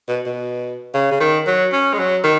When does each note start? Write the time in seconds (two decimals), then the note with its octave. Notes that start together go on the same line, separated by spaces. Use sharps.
0.08 B2
0.26 B2
0.94 C#3
1.11 C#3
1.20 D#3
1.47 F#3
1.73 C#4
1.94 G#3
1.99 F#3
2.24 D#3